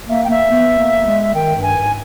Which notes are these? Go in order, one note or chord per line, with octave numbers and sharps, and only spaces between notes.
A#3 E5
G5
A#3 E5
B3
A#3
G#3
D#3 G5
G2
G#5
G#2